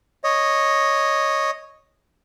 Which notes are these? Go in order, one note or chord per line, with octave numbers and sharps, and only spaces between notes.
C#5 D#5